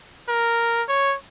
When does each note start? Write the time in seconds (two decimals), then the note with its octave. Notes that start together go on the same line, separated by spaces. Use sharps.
0.29 A#4
0.89 C#5